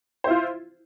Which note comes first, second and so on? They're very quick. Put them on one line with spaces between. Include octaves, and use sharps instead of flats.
C5 E4 F4